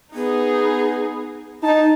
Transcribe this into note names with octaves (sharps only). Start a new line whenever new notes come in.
B3 D#4 G#4
D#4 D#5 A5